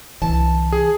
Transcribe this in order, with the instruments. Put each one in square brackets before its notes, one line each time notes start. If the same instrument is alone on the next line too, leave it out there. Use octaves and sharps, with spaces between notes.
[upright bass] C2 D3 [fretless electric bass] E3 [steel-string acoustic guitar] A5
[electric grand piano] G#4